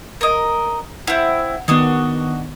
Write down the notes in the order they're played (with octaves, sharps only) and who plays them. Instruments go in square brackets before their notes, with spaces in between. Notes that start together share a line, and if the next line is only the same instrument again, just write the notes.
[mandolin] A#4 D#5
[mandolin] C4 E4 [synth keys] F#5
[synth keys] D#3 B3 [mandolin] D4 F#4 D#5